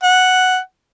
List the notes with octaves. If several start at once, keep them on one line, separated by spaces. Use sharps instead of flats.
F#5